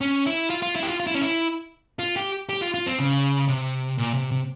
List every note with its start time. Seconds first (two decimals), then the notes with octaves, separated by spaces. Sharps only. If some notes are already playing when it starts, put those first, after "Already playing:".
0.01 C#4
0.26 E4
0.50 F4
0.62 F4
0.76 E4
0.83 G4
0.88 F4
1.00 F4
1.07 E4
1.15 C#4
1.21 E4
1.99 F4
2.16 G4
2.49 G4
2.61 F4
2.74 F4
2.86 C4
2.99 C#3
3.48 C3
3.98 A#2
4.14 C3
4.31 C3